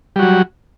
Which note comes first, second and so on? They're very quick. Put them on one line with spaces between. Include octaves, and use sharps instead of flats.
G3 F#4 F#3